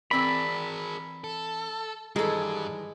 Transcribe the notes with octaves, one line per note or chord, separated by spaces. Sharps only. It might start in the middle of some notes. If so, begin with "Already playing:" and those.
E3 C4 G#4 A#4 D5 B5
A4
G2 D#3 E3 G3 G#3 A4